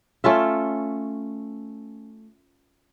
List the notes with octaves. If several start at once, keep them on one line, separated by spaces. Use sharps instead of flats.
A3 C#4 F4 E5